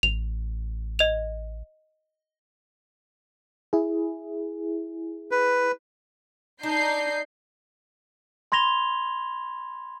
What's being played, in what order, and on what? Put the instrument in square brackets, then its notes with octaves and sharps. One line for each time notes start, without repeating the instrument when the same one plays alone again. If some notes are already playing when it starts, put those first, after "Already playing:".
[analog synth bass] A1 [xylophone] F7
[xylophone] D#5 F7
[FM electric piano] E4 G#4
[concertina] B4
[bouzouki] D4 [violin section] D#4 G6 C7
[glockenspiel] B5 C6 G#6 A#6 F7 G7